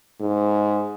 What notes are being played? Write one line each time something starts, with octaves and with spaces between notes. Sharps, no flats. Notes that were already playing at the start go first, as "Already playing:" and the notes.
G#2